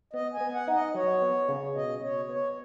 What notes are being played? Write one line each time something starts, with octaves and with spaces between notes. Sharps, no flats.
B3 D#5
G#5
B3
F#5
D#4
D#5
F#3 C#5
B3
C#3
B2 D#5
B2 C#5
B3 C#5